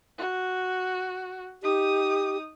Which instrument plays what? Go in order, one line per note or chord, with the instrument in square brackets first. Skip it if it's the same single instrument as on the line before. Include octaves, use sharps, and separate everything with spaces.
[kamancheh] F#4
[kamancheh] D#4 D#6 [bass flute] G4